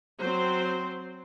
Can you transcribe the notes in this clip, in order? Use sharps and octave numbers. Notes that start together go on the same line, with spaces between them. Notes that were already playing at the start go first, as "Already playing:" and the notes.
F#3 C4 C5